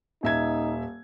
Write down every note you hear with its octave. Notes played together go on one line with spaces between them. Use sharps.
D#1 D#4 E5 G#6